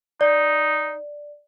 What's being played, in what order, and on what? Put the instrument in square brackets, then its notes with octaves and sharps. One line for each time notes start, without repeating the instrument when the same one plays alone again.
[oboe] D#4 [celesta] D5